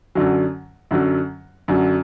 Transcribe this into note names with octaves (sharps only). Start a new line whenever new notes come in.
F#2 D3 F#3
F#2 D3 F#3
F#2 D3 F#3